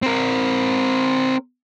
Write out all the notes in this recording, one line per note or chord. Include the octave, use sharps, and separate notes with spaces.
C4 A#4